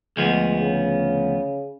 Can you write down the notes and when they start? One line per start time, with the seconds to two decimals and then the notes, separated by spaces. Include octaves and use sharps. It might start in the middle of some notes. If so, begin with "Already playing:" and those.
0.17 D2 F3 G#3 B3
0.60 C#3